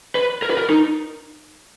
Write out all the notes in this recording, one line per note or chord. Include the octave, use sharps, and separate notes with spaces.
B4
A#4
B4
A#4
D#4